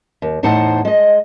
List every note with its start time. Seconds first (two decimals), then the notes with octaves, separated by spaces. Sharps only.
0.22 D#2
0.43 E2 A2 D#4 C5 F#5 A5
0.85 G#3 D#5